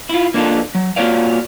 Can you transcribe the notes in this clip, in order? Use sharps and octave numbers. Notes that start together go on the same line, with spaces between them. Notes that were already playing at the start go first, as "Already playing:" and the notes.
E4 F4
A#3 D4 D#4 F4 A4
F#3
A#3 F4 F#4 C#5 D5 F5